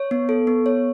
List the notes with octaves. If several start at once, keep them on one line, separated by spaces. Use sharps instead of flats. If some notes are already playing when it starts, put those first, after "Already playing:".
Already playing: C#5
B3
A4
B3
C#5